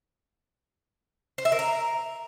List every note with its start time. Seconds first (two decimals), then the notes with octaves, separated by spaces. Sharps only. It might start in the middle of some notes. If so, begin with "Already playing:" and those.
1.38 C5
1.45 E5
1.52 A#4
1.59 A#5